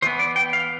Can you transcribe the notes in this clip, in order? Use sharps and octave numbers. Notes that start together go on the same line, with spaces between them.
E3 B3 C5
D5
G5
F5